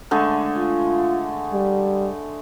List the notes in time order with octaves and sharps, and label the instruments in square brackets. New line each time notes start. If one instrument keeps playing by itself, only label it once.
[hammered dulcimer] D3 G#3 A3
[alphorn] F4
G3